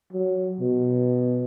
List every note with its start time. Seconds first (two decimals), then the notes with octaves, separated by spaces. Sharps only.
0.13 F#3
0.60 B2